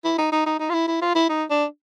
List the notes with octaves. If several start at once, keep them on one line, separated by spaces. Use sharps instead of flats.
E4
D#4
D#4
D#4
D#4
F4
E4
E4
F4
E4
D#4
D4